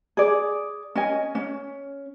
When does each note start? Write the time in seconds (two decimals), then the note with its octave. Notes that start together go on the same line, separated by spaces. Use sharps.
0.17 G#4 D5
0.95 C#4 D#5 G#5
1.35 C#4